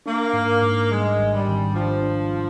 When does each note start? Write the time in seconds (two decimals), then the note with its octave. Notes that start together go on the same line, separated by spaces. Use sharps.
0.06 A#3 D4
0.33 G#2
0.63 G#2
0.91 G3 G#3
1.19 G#1
1.33 G3
1.48 G#1
1.75 F3 D4
2.03 D4